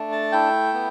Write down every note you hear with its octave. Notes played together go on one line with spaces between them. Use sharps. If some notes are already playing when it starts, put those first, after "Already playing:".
Already playing: A3 D4
A5
E4 G5
B3